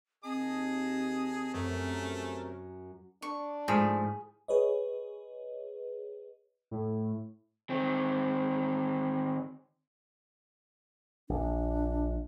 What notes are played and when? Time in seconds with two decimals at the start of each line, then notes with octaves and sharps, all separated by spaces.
0.24 D#2 C4 G#4 D#5 A5 D#6
1.54 F#2 C3 A3 C#4 A#4
3.22 D4 C#6
3.68 G#2 F3 A3 G#4 B5
4.48 G#4 B4 C#5 D#5
6.71 A2
7.70 D#3 C4
11.29 A#1 D4